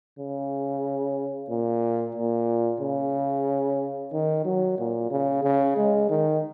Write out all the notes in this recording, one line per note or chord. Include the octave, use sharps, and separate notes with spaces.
C#3
A#2
A#2
C#3
D#3
F#3
A#2
C#3
C#3
G#3
D#3